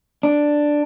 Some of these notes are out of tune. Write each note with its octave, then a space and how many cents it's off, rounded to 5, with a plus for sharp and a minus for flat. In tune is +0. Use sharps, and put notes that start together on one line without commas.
D4 +5